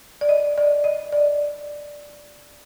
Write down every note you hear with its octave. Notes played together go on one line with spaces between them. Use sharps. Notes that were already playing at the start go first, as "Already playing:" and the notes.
D5
D#5
D5
D#5
D5